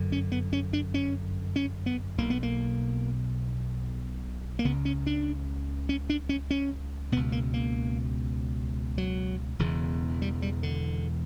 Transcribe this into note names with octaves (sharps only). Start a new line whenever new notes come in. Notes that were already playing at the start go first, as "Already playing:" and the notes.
Already playing: G1 F#2 D3
C#4
B3
C#4
D4
C#4
C#4
B3
B1 B2 A#3
B3
A#3
A#3
C#2 C#3 B3
C#4
D4
C#4
D4
C#4
C#4
C#2 B2 B3
A#3
A#3
F#3
E1 E2 C#3
G3
G3
D3